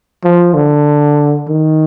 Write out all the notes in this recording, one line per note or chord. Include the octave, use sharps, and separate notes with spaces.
F3
D3
D#3